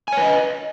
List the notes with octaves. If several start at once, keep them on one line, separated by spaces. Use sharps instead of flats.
B4 C#5 D#5 G#5